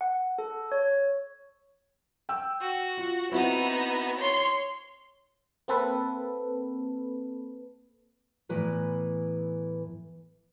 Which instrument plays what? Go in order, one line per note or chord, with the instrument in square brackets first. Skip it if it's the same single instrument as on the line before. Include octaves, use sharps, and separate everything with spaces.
[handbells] F#5
A4
C#5
[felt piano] G5 E6
[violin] F#4
[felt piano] F4
[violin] B3 D#4 [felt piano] C4 E4 F#4
[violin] C#5 C6
[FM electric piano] A#3 C4 A4 B4
[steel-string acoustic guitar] E2 A2 E3 B4 A#5